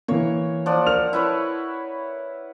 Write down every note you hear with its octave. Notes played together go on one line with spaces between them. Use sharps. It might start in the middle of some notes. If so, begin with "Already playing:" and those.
E3 A#3 C#5
F3 D5 F#5
A#4 F6 F7
E4 B4 C#5